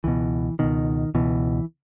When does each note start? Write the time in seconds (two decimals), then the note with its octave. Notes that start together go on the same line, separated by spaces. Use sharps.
0.04 C#2 B2 E3
0.59 C#2 B2 D#3
1.15 C#2 B2 E3